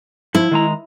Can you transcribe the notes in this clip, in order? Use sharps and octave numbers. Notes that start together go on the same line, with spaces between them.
F3 E4
D#3 G#3 A#5